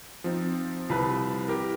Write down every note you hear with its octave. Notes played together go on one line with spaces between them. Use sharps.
F3 C4 D#4
C2 B4
E4 G4 A#4